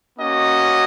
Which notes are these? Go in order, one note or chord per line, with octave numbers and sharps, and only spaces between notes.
A#3 C#4 F#4 D#5